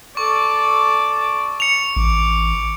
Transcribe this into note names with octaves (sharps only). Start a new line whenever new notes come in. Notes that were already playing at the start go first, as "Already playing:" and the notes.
A4 D5 C#6
C#7 F7
A1 D6